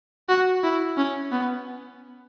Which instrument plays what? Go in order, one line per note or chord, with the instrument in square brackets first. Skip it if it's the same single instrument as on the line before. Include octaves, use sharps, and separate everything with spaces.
[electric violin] F#4
E4
C#4
B3